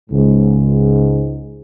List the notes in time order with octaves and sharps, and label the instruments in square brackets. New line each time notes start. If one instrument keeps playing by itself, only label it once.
[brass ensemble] C#2 G#2